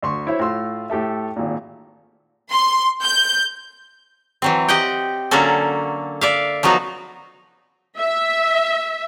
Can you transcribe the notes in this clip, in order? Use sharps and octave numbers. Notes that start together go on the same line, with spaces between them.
D2 C6 C#6
E4 C5 C#5 E5
A2 F4 C6 E6
A2 G4 A4 E5
G#1 A#2
C6
G6
E3 F#3 C4
G4 D#5 F#5 G5
D3 F#3 A#3 C#4 F#4 A4
D5 E5 F5
F3 F#3 B3 D#4 F#4
E5